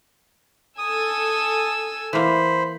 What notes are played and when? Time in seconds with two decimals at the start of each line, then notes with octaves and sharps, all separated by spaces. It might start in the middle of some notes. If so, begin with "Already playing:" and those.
0.78 A4 G#5 D#6 E6
2.13 E3 A#3 C5 B5